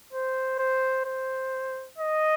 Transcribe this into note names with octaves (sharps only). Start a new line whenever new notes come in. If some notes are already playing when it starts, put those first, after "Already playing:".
C5
C5
C5
D#5